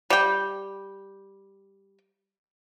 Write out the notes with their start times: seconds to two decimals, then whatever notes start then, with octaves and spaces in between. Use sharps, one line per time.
0.10 G3 G5